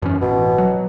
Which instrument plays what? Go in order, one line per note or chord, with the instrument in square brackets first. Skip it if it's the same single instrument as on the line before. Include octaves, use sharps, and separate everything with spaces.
[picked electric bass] F#2 E3 C#4
[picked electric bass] A1 [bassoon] B2
[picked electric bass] F#3